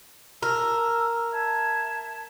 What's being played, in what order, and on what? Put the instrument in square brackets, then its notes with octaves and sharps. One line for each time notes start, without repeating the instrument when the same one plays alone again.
[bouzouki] A#4 [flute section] A5 E6
[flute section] E5 A5 G#6